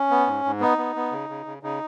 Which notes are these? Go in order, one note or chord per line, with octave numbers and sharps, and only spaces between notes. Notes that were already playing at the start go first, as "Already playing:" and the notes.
Already playing: C#4
B3
G#2
G#2
B3 D#4
B3
B3
C#3
C#3
C#3
C#3 D#4